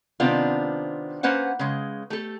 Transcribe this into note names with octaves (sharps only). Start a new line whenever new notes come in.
C3 D#3 B3 C4 D4 F4
A#3 C#4 B4 C5 F#5
C#3 G#3
A3 G4 A4